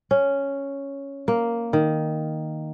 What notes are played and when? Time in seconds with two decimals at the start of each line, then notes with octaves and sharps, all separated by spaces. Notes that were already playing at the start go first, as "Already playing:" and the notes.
0.11 C#4
1.28 A#3
1.73 D#3